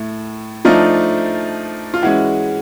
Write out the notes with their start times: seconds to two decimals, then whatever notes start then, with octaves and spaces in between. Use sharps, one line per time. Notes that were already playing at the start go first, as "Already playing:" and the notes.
Already playing: A2 A3
0.65 F3 A3 D4 D#4 F4
1.94 F4
2.02 E3 G#3 C#4 E4 F#4